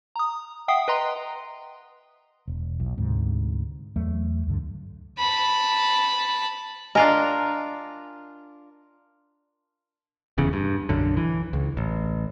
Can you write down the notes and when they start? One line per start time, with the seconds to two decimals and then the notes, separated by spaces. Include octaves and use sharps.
0.16 A#5 D#6
0.68 E5 F#5 G5 D#6 C7
0.88 B4 D#5 G5 A#5 C6
2.47 E1
2.80 B1
2.97 D2 G#2 C3
3.96 E2 F#3 A3
4.47 D2 G2 D3
5.19 A5 B5
6.95 D4 F4 A#4 D#5 G#5 A#5
10.38 F1 E2 C#3
10.53 G2
10.89 B1 F#2 D3
11.17 E3
11.53 C#2
11.77 A1